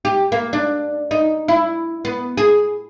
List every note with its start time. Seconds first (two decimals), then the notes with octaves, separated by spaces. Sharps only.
0.05 G4
0.32 A#3
0.53 D4
1.11 D#4
1.48 E4
2.05 B3
2.37 G#4